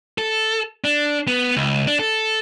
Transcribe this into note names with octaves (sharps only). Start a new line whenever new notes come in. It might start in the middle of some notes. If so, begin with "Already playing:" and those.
A4
D4
B3
C#2
D4
A4